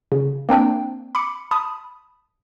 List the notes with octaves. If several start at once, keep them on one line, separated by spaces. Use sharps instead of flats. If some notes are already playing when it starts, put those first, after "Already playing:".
C#3
A#3 C4 D4 G5
B5 D6 C#7
A5 B5 D#6